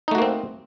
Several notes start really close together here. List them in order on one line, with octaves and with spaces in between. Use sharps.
D#4 A3 F#4 A#3 C4